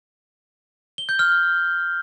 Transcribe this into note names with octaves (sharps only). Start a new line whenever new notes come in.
G7
G6
F6